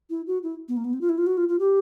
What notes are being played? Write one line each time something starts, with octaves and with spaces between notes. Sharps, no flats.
E4
F#4
E4
B3
A#3
B3
C4
F4
E4
F4
F#4
F4
F4
G4